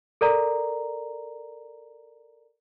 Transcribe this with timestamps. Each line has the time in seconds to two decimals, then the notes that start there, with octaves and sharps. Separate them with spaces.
0.21 A4 A#4 D5 A#5